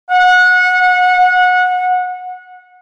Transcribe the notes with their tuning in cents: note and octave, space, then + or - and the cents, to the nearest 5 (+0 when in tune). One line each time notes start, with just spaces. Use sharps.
F#5 -25